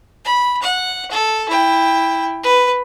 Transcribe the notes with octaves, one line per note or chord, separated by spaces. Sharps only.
B5
F#5
A4
E4 G5
B4